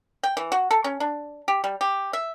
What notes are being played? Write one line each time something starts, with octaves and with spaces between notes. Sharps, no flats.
G5
E3
F#4
A4
C#4
D4
G4
G3
G4
E5